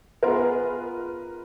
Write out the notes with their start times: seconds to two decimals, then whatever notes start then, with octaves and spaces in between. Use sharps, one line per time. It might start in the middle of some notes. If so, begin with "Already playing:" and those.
0.23 B3 F4 G#4 A#4
0.39 B4